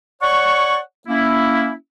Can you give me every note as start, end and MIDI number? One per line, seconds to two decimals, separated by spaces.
0.22 0.79 73
0.22 0.79 74
0.22 0.79 78
0.22 0.79 85
1.08 1.73 58
1.08 1.73 61
1.08 1.73 64